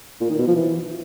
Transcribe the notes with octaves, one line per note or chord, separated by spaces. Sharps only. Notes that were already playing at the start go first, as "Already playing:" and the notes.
A#2
D#3
B2
F3
E3